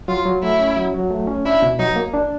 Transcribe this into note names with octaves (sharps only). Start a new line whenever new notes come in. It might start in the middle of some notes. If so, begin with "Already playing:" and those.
F#3 F4
F#3
A3 E4
C#4
F#3
F#3
A3
C#4
D4 E4
B2
F#3 D#4
A#3
D4